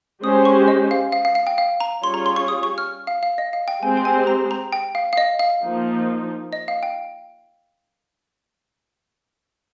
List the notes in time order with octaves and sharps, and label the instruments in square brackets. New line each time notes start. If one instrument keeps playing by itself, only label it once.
[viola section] G#3 C#4 G4 C5 [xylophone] D#6
[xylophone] C#6
D#5
F5
F5
F5
F5
G5
F5
A#5
[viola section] G3 C#4 F4 G#4 C#5 [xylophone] C6
[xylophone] A#5
C6
C#6
D#6
C#6
F6
F5
F5
D#5
F5
G5
[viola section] G#3 C4 G4 C5 [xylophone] G#5
[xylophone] G5
G#5
A#5
A#5
G5
F5
F5
D#5
F5
[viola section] F3 A#3 D#4
[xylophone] D#5
F5
G5